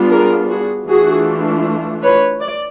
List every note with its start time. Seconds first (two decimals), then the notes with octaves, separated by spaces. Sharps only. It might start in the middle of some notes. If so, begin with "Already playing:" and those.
Already playing: G3 B3 D4 F4
0.10 G#4 A#4
0.49 F#4 G#4
0.87 E3 A3 D4 F4 F#4 G#4
2.03 B4 C#5
2.40 D5